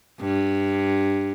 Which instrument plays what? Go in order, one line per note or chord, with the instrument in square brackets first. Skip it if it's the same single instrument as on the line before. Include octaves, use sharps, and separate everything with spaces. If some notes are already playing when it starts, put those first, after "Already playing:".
[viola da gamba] G2